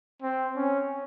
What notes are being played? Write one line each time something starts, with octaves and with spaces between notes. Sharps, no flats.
C4
C#4